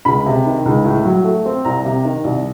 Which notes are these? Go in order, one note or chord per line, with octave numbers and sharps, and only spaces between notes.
C#2 B5
C3
D#3
C#2
A2
F#3
A3
C4
C2 A#5
C3
D#3
C2